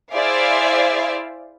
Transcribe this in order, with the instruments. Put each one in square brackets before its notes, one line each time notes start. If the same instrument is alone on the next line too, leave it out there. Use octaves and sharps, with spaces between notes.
[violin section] E4 G#4 C5 D5 E5 F5